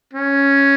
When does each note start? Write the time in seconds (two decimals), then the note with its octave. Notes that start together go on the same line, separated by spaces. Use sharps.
0.14 C#4